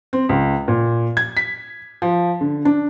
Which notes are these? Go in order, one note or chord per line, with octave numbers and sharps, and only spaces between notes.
C4
C#2
A#2
G#6
B6
F3
D3
D4